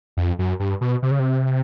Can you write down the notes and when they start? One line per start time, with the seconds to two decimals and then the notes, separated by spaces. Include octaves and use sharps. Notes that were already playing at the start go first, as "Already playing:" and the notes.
0.17 F2
0.39 F#2
0.60 G2
0.81 B2
1.02 C3
1.11 C#3
1.19 C3